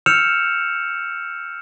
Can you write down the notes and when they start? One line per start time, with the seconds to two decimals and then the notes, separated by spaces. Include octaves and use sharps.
0.06 E6 F6 G6 C#7 E7 F7